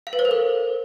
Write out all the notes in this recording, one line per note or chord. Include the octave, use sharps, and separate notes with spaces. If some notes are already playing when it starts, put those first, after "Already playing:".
F5
B4
C5
A#4
A4